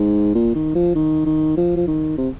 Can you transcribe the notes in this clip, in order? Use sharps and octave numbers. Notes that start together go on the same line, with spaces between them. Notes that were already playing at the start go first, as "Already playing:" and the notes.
Already playing: G#2
A#2
D#3
F3
D#3
D#3
F3
F3
D#3
C3